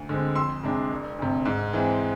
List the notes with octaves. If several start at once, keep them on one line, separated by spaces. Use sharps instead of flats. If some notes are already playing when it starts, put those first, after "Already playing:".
Already playing: D2
D3 G#3 C4
F2 C6 E6
C3 G#3 D4
E1
D2 C3
G#2
E3 G#3 C4